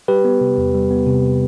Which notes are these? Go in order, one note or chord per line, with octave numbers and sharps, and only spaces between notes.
G3 G4 B4
B3
C3
E2
G3
B3
C3